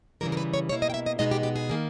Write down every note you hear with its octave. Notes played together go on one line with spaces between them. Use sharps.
C#3 E3 G3 A#4
A#4
B4
C#5
B2 A#3 E4 C#5
D#5
G5
E5
D#5
E2 B2 G#3 B3 D#4 D#5
G4
G4
G#4
D#3 A#3